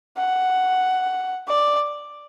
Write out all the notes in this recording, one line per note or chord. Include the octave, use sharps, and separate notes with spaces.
F#5
D5